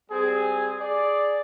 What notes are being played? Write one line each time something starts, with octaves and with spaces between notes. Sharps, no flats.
G3 C4 G#4
G#4 D5